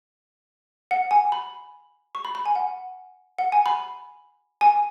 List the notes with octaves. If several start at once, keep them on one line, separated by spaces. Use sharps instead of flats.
F#5
G#5
B5
C#6
B5
B5
G#5
F#5
F#5
G#5
B5
G#5